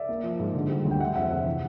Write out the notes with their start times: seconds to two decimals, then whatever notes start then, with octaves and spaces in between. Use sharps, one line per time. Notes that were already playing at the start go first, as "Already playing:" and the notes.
Already playing: D5 E5
0.09 A#3
0.23 F3
0.39 G#2
0.54 D3
0.70 G3
0.85 D2
0.91 G5
1.00 G#3 E5 F#5
1.15 F2 E5 F#5
1.31 C3 E5 F#5
1.46 E3